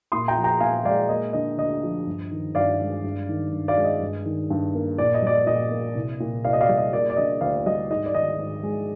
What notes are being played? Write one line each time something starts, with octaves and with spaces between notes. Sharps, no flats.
A#2 C6 D#6
G5 A#5
F3
G5 A#5
A#2 F5 G#5
G#3 D5 F5
A#3 D#5
D3 D#5
D2 D#5
F3
G2
D#3
G2 D5 F5
G#3
G2
D#3
G2
D5 F5
G#3
D#5
G2
D#3
G2
A#3
A#2 D5
D#5
G3 D5
D#5
A#2 D#5
A#3
C2
A#2
C2 D5 F5
D#5
D5 F5
G3
D#5
A#3 D5
D5
D3 D#5
D2 D5 F5
G3 D#5
G#2 D#5
D5
D#3 D#5
G#2
G#3